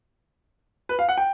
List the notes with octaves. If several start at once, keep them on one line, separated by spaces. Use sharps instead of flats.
B4
F5
F#5
G5